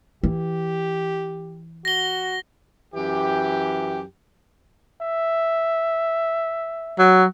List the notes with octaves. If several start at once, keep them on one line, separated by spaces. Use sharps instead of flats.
E3 G4
F#4 A#6 G7
F#2 E3 G4
E5
F#3